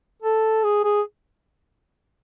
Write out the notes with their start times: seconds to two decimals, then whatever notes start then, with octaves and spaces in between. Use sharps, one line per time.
0.22 A4
0.64 G#4
0.84 G#4